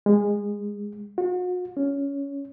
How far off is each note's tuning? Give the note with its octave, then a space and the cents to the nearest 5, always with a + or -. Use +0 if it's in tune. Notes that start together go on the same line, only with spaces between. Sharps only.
G#3 -20
F#4 -40
C#4 +15